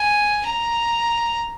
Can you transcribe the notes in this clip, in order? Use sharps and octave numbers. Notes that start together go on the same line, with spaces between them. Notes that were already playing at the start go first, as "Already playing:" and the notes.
Already playing: G#5
A#5